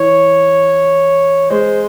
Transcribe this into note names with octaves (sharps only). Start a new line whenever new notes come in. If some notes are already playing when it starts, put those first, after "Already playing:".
Already playing: E3 C#5
G#3 C5